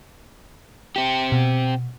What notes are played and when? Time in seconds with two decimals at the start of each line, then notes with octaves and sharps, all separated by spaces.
0.96 C4 G4
1.32 B2